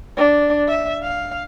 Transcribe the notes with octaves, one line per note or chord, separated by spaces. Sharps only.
D4
E5
F5